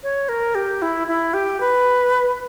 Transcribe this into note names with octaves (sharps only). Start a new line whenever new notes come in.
C#5
A#4
G4
E4
E4
G4
B4